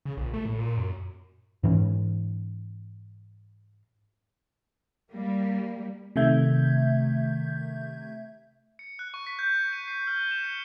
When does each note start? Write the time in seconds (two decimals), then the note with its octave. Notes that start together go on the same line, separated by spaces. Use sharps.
0.05 C#3
0.17 A#1
0.34 A3
0.45 A2
0.59 A#2
0.77 F#2
1.63 G#2 E3 C#4
5.11 G3 A#3
6.16 C3 D#3 A3 E5 G6 G#6
8.79 C#7
8.99 F#6
9.14 C#6
9.27 B6
9.39 G6
9.60 C#7
9.73 D#7
9.88 C7
10.07 F6
10.31 E7
10.44 C#7